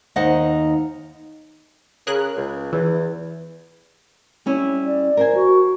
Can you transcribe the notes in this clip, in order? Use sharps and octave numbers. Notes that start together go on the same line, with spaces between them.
D#2 D#4 C5 D#5 F#5
C#3 G#4 A#4 F#6
C#2
E2 E3
G3 C#4 E4
D5
A#4 C5 G#5
F#4